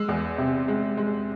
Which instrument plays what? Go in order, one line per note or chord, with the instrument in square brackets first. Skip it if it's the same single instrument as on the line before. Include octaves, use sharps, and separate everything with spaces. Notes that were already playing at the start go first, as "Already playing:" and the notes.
Already playing: [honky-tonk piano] G#3 E6
E2
C3
G#3
G#3